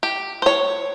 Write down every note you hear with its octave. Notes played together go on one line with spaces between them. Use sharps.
G4
C5 C#5